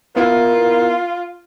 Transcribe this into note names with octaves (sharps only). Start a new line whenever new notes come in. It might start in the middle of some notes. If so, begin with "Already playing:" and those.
B3 E4 F4 A#4